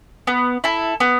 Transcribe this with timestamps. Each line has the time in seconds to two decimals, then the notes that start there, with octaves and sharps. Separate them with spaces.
0.27 B3
0.64 E4 A4
1.00 B3